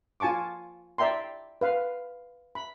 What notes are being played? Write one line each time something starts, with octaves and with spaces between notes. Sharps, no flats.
F4 G#5 A5 C#6 D6
D5 E5 G5 A#5 C6
B4 F5
B5